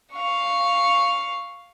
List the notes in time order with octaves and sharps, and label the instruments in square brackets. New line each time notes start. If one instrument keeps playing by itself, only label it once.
[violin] F5 C#6